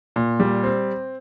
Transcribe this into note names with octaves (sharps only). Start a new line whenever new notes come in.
A#2
G3
C4